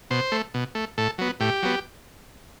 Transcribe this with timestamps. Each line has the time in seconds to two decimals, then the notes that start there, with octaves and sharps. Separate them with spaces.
0.10 B2 C5
0.32 A3
0.54 B2
0.75 A3
0.98 A2 A4
1.18 F#3 B3
1.40 A2 G4
1.63 F#3 B3